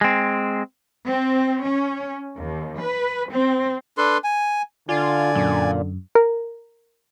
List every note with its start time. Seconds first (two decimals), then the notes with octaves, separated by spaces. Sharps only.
0.01 G#3 C4
1.07 C4
1.64 C#4
2.37 D#2
2.81 B4
3.30 C4
3.98 D4 A4 B4 C6
4.24 G#5
4.89 D3 F4 D5 G#5
5.35 F#2 A#2
6.15 A#4